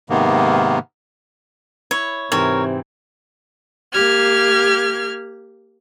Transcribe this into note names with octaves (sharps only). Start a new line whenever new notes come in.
G#2 C3 D#3 A#3 B3
E4 C#5
G#2 C3 E3 C4 A#4 C#5
A#3 G4 F6 G#6